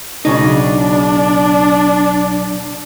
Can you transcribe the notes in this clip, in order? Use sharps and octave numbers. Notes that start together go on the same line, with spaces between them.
B1 C#3 D4 D#4